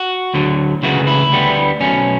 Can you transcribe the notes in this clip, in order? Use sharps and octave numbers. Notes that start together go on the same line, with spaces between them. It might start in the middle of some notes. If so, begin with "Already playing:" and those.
Already playing: F#4
D2 D3 F#3
C#2 C#3 E3 A3 F#4
E4
D2 D3 G3 B3
B1 B2 A3 C#4